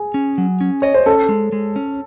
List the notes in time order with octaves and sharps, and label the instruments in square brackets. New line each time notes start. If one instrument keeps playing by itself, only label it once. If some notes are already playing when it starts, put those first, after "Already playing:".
Already playing: [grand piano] G#4
[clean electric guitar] C#4
F#3
C#4
[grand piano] C#5 [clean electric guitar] D#5
[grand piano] C5
[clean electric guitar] C#4 [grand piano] A4
[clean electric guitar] G#3
G#3
C#4